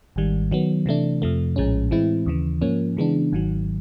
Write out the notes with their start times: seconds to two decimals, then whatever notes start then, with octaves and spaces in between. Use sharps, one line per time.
0.16 G#1 G#2 D#3 G3
0.51 D#3 F#3 B3
0.86 C3 E3 A3 D4
1.22 F2 C3 F3 A3
1.56 A#1 A2 F3 G#3 C#4
1.91 A2 E3 G#3 C4 E4
2.26 D#2 C#3 E3
2.61 G#2 F3 A#3 C#4
2.97 C#3 E3 G#3 B3 D4
3.33 G#1 G#2 D#3 F#3